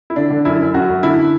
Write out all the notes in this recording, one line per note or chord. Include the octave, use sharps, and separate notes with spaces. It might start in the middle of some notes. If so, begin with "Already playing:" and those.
E4
D3 D4
D3
F#2 E4
F#2
F#2 F#4
F#2
D3 E4